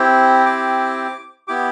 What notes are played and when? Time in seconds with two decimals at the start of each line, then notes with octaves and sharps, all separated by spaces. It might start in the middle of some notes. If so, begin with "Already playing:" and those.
Already playing: C4 E4 G4
0.46 D6
1.48 B3 E4 G4 D6